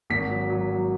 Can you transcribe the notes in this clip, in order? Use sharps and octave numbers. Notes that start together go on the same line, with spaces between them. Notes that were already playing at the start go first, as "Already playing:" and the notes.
G#1 B6
F#3
F#3
F#3